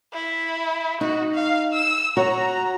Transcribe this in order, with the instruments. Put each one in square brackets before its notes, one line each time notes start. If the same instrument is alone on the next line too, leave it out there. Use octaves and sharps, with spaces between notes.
[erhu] E4
[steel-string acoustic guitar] D#4 [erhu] F#4
[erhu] F5
E6
[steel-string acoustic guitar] F#4 C#5 [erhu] A#5